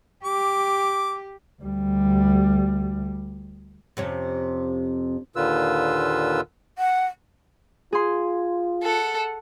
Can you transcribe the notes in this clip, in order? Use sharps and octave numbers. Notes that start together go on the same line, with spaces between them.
G4 D6
D2 G3
F2 C3 C#4
D#2 A#2 D3 F4 B4 E6
F#5
F4 G#4 C6
A4 F#5